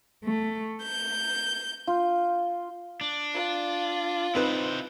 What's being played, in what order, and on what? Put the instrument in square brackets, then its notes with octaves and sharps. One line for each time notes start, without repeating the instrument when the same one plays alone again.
[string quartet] A3
G6
[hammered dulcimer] F4
[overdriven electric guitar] D4
[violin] F4
[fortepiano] C4 D#4 B4 [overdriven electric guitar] E4 C5